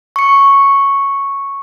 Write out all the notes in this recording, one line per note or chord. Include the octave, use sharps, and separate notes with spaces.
C#6 C#7